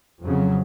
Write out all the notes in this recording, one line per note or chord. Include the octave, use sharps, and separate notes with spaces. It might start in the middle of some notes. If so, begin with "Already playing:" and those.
F2 C#3 F#3